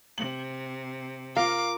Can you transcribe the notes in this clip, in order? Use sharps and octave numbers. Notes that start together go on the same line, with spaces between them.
C3 F#7
F4 A#4 F5 D6